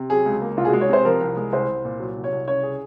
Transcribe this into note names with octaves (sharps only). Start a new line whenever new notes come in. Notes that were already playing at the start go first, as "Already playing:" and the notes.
Already playing: C3
F#3 G#4
C#2
A#3
C2 F4
G#4
G#3 F#4
C#5
C3 C5
F3 A#4
C2
G#3
C2 C5
C2
A#2
F#3
C2
C#5
C2
C#3 C#5
G#4